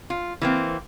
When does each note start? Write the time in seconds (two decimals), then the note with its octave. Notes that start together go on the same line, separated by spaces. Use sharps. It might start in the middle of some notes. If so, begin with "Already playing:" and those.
0.10 F4
0.42 E3 A#3 C4